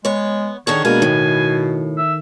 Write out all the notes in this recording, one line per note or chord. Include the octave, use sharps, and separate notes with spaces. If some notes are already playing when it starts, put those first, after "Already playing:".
G#3 B3 C#5
D3 D#3 D#4 G#4 C#5
G2 B2 G#3 A#3 B3 D4 A#4 G#5
A2 D#3
E5